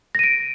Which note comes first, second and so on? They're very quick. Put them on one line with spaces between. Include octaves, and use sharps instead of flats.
A#6 D#7 D7